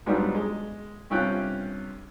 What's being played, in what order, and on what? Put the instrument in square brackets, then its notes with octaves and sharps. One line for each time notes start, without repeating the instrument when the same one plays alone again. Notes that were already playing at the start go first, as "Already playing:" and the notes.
[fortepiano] G#2 F#3 G3 B3 D4 F4
G#3
G2 C3 C#4 F4 G5 F#6